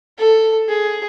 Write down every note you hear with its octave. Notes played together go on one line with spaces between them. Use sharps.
A4
G#4